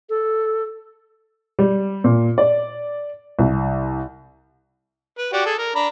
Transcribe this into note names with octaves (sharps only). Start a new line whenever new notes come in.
A4
G3
A#2
D5
C2
B4
F#4 G4 D5
G#4 A4
A#4
D4 A#5 B5